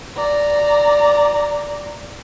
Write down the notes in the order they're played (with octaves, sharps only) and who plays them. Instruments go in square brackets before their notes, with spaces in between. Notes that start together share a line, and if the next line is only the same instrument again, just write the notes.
[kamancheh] D5 A#5